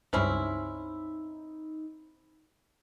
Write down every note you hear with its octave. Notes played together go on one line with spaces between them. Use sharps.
C#2 G2 C4 C#4 D#4 E4